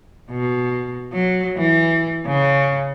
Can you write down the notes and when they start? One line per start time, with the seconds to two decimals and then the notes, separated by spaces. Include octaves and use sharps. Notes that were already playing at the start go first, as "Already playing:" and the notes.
0.31 B2
1.13 F#3
1.57 E3
2.27 C#3